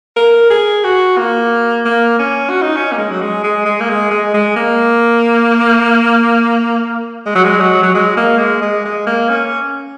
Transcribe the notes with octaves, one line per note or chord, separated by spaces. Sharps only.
A#4
G#4
F#4
A#3
A#3
C#4
F#4
D#4
C#4
A#3
G#3
F#3
G#3
G#3
G#3
A#3
G#3
G#3
G#3
A#3
G#3
F#3
G#3
F#3
F#3
G#3
A#3
G#3
G#3
G#3
A#3
C#4